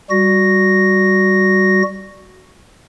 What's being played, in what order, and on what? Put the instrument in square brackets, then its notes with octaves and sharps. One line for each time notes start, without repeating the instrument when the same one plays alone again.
[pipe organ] G3 F#4 A#6